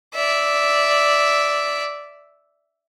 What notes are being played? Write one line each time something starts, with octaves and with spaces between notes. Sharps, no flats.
D5 E5